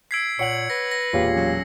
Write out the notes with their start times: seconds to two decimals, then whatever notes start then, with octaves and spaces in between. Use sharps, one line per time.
0.11 E6 G#6 B6 C7 D7
0.39 A#2 C#5 F#5 C#7 F#7
0.70 B4 A#6
0.91 A#6
1.13 E1 A#2 F4 G4 C#5 F5
1.35 F#3 C#4